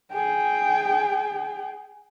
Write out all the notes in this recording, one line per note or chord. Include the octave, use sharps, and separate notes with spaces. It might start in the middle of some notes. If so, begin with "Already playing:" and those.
G#4 G5